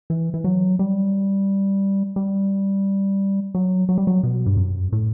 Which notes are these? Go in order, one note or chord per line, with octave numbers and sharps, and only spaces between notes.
E3
E3
F#3
G3
G3
F#3
F#3
G3
F#3
B2
G2
F#2
A2